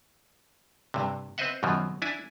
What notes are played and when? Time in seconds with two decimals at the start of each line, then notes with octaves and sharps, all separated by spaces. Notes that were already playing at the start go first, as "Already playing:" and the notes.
0.94 G2 C3
1.38 C4 B4 C5 D#5 E5 F#5
1.63 F#2 B2 D#3 F3 F#3
2.02 D4 E4 G#5